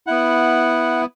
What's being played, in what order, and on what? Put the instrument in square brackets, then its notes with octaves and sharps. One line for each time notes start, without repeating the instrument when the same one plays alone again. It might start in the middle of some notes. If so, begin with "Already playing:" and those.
[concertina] B3 E4 F#5